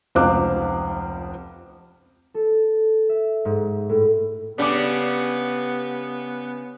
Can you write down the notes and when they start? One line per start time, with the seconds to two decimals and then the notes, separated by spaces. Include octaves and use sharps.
0.15 F1 C#2 C4 F5 D6 F#6
2.34 A4
3.09 E5
3.45 G#2
3.89 A2
4.58 C#3 G3 B3 D4 D6